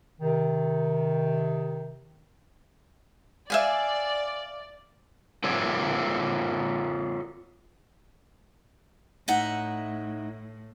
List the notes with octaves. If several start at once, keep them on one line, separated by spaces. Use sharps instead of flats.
C3 D#3
D5 E5 F5 G#5
F4 A4 C#5 D5
A2 D#4 E5 F#5